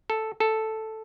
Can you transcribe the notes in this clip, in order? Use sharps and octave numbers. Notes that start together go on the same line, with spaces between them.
A4
A4